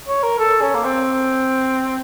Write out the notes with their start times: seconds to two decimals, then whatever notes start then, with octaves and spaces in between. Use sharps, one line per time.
0.08 C#5
0.23 A#4
0.39 A4
0.62 C#4
0.74 A#3
0.84 C4